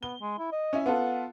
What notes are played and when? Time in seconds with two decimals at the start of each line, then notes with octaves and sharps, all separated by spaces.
0.03 B3 G7
0.21 G#3
0.38 E4
0.52 D#5
0.73 C#4 E4
0.86 B3 F4 A4 F#5